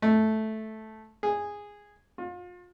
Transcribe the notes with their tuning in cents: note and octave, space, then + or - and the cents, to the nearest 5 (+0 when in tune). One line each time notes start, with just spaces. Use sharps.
A3 -10
G#4 -10
F4 +35